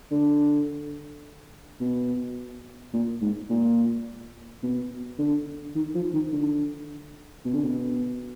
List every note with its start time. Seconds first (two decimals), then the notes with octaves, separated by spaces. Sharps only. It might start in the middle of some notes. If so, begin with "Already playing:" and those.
0.11 D3
1.80 B2
2.93 A#2
3.21 G#2
3.50 A#2
4.63 B2
5.18 D3
5.75 D#3
5.95 F3
6.14 D#3
6.32 D3
7.45 B2
7.54 D3
7.64 B2